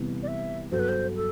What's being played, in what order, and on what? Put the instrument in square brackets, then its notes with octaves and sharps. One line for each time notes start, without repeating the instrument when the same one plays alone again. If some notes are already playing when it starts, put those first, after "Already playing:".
Already playing: [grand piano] C3 E3 G3 B3
[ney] D5
E5
[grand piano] G2 F#3 B3 F#4 A4 [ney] C5
[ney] B4
C5
A4